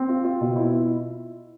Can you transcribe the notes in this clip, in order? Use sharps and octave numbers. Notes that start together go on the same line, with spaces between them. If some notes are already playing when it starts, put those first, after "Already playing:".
Already playing: C4
F4
F4
B2
E4